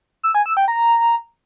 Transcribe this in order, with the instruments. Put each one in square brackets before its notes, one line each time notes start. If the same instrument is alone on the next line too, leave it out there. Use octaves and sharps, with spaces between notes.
[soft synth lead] E6
G#5
E6
G5
A#5